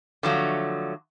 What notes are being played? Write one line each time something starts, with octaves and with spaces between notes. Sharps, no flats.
D3 F3 F#3 A3